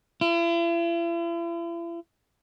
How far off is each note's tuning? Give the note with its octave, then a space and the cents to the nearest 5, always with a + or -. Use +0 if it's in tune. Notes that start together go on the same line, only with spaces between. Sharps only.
E4 +45